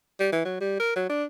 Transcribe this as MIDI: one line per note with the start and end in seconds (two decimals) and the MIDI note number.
0.20 0.28 55
0.32 0.45 52
0.45 0.58 54
0.61 0.76 55
0.80 0.93 70
0.96 1.09 54
1.09 1.24 62